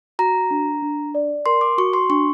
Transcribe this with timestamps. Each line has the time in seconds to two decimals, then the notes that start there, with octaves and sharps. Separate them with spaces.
0.19 F#4 A#5
0.51 D4
0.82 D4
1.15 D5
1.46 A#4 C6
1.61 D6
1.78 F#4 C#6
1.93 C6
2.10 D4 C#6